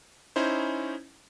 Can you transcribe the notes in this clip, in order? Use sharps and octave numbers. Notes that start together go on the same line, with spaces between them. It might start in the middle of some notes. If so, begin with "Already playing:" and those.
C#4 D#4 E4 C5